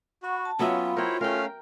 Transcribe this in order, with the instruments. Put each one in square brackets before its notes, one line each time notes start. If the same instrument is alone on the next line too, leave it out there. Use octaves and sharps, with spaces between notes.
[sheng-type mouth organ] F#4 [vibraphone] F#5 B5 C#6
[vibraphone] A5
[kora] F#3 B3 E5 [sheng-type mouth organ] C#4 [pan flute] F4 [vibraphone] F5 G5 B5
[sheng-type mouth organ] E4 C5 C#5 [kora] A#4 G5 [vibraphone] A#5
[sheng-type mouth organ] A3 C#4 F5 [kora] A#4 G5